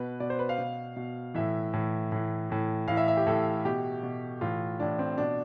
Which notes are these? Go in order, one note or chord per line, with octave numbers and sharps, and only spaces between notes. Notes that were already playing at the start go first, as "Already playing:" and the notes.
Already playing: B2 B4
B2 D5
C5
B4
F5
B2
B2
A2 E3 E5
A2 E3
A2 E3
A2 E3
A2 E3 F5
E5
E5
G4
A2 E3 A4
B2 G4
B2
A2 E3 F4
A2 E3 D4
C4
B2 D4